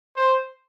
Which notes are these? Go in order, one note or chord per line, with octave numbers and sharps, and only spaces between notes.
C5